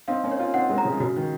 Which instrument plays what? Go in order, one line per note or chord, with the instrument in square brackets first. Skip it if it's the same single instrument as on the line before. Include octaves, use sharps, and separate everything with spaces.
[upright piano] C4 D#4 [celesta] F5
[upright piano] A#3 C#4
[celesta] C#5
[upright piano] C#4 F4
[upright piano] C4 D#4 [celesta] F#5
[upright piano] G#3 C4
[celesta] A#5
[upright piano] C#3 F3
[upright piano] C#3 [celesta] F#4
[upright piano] D#3